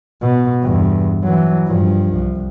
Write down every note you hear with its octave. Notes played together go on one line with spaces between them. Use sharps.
B2
E2 G2
E3 F#3
G2 F3
C2